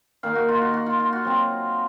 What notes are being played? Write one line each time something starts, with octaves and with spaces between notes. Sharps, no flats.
D#3 A#3 D#4 F5
F#4
F4
F#4
F#4
F4
F4
F#4
F#3 C4 F4